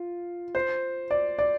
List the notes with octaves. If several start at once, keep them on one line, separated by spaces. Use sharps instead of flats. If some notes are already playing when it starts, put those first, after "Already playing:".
Already playing: F4
C5
D5
D5